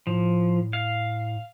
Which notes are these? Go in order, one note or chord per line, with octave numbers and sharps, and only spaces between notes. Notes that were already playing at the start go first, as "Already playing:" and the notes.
A2 F3
F5